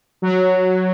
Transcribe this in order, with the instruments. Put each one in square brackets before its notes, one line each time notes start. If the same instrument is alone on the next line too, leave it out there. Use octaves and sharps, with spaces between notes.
[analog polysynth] F#3